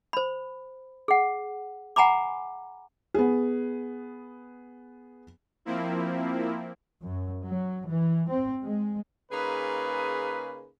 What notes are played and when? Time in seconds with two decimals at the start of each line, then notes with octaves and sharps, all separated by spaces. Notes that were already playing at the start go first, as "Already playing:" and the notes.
0.13 C5 B5
1.08 G#4 F#5
1.96 F#5 G#5 A#5 B5 D6
3.14 B3 G#4
5.65 F3 A#3 C4 E4
7.03 F#2
7.46 F#3
7.87 E3
8.29 C4
8.63 G#3
9.32 C#3 A#3 D#4 G#4 B4